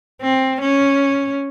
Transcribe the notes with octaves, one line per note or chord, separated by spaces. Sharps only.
C4
C#4